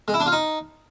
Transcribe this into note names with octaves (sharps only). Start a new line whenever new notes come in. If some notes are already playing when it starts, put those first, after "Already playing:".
G#3
E4
D4
F4
D#4